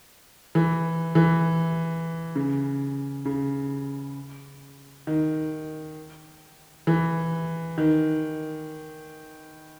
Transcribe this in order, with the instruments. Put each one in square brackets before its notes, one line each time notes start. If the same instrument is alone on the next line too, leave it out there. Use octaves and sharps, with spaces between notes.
[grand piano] E3
E3
C#3
C#3
D#3
E3
D#3